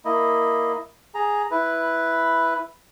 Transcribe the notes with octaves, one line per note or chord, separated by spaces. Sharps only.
A#3 E4 D#5
G#4 A#5
E4 B4